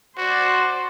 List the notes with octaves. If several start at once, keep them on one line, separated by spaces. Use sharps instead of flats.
F#4 C5 D5